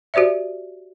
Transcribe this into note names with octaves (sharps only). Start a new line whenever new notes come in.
F#4 G4 C5 D5 E5